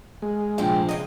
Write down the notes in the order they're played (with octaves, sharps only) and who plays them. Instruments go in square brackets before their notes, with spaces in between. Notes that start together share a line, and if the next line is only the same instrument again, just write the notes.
[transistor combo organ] G#3
[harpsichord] A#1 [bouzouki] C3 C5 G5
[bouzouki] C#3 G#3 [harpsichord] D#5